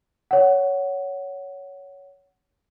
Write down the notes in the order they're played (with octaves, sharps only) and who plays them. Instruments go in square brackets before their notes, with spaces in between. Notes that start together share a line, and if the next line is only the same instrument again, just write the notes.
[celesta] C#5 F#5